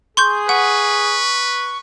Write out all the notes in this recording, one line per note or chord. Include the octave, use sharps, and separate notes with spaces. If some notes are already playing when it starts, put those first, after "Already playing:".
G#4 C6 C#6 G6
B4 F#5 C#6